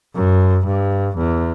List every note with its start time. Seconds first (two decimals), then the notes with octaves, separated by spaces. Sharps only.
0.15 F#2
0.66 G2
1.17 E2